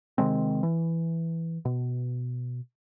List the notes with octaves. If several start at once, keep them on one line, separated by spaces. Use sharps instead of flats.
C3 D#3 G#3 C4
E3
B2